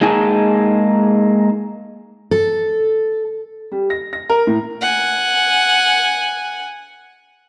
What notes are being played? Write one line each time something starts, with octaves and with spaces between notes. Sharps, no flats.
G#3 A#3 D#4 G#4 G#5 A5
A4
G3
A#6
A#6
A#4
A2
F#5 G#5